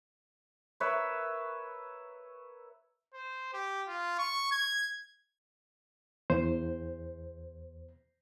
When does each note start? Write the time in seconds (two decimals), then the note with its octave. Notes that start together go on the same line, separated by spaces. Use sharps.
0.80 A#4 B4 C#5 E5
3.14 C5
3.53 G4
3.88 F4
4.19 C#6
4.51 G#6
6.30 E2 C5